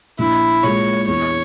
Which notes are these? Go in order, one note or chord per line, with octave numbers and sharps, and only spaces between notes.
A#1 E4
A#2 G#3 C#5
E2 C#5